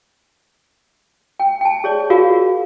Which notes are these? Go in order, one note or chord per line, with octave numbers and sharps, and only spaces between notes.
G5
G5 A5
G#4 C#5 D5
F4 F#4 G#4 A#4 F5